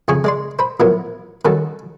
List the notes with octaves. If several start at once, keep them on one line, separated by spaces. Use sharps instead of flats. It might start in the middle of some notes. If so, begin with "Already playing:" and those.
F2 C#3 G#4 G#5 C#6
G#3 D5 C6
C5 B5
A1 F3 F#3 B3 A#4
D#3 G3 C#4 F#4 A4 A5